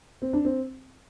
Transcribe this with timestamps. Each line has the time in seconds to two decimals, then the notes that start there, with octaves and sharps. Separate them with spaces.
0.22 C4
0.33 D4
0.45 C4